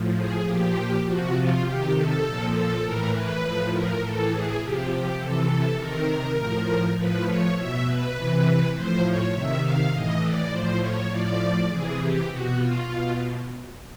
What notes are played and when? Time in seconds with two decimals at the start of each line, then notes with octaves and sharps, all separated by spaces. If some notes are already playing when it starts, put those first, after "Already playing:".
Already playing: A2 F3
0.16 G#4
0.46 A#2 F3 G4
1.06 C3 F3 F#4
1.35 F4
1.65 C3 D#3 G4
1.94 A4
2.24 A#2 F3
2.54 A4
2.82 A2 E3 A#4
3.12 B4
3.43 A2 F3
3.72 A#4
4.01 A2 E3 A4
4.31 G#4
4.60 C3 F3 G4
4.89 G4
5.19 C3 E3 A4
5.49 A4
5.78 C3 D#3 A#4
6.37 A2 F3
6.96 A2 F3 B4
7.26 C#5
7.56 B2 E5
7.86 B4
8.15 C3 E3
8.74 A2 F3 C5
9.03 C#5
9.33 C3 D#3 E5
9.62 F5
9.92 A2 E3 D#5
10.22 D5
10.51 A2 F3 C5
10.81 C#5
11.10 A2 F3 D5
11.69 C3 E3 G#4
11.99 G4
12.28 B2 F#4
12.58 F4
12.88 B2